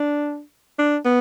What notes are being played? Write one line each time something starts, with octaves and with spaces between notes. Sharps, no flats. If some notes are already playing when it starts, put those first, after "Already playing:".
Already playing: D4
D4
B3